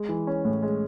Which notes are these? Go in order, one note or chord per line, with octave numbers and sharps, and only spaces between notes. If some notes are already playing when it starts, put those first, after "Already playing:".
Already playing: G#3
E3
C#4
A2
G#3